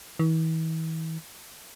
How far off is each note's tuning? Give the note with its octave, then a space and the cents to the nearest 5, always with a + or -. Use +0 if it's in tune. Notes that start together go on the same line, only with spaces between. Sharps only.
E3 -40